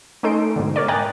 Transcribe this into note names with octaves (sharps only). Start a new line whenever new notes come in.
A3 C#4 D#4 A4 C6 D7
G#2 B2 D3
A#4 C#5 D5
D#5 G5 G#5 A#5 F#6 A6